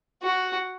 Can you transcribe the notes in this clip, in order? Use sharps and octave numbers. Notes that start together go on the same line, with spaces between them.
F#4